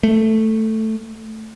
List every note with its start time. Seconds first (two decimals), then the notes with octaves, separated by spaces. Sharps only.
0.03 A3